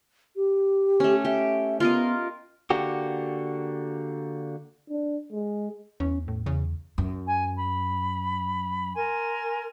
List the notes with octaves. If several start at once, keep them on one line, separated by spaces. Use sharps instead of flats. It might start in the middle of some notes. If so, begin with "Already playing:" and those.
G4
A3 C#4
G4 E5
B3 F4 A#4 D#5
D3 A#3 F#4 G4
D4
G#3
E2 C#4
A2
E2 C#3
F#2
G#5
B5
A#4 G#5 C6